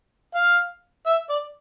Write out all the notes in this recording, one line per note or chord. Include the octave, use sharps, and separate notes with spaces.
F5
E5
D5